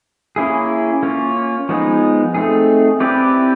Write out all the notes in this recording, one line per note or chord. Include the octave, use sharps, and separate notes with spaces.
A#3 C#4 E4 G#4
A#3 C#4 F4
F3 G#3 B3 D#4 G#4
A3 C4 D#4 G#4
C4 E4 G4 B4 D5